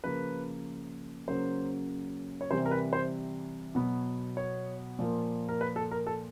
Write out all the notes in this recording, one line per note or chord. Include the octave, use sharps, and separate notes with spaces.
C#3 F3 A#3 B4
C#3 F#3 A#3 C#4 C5
C#5
C3 E3 G3 C5
A#4
B4
C5
B2 F#3 B3
C#5
A#2 F3 A#3
A#4
B4
A4
A#4
A4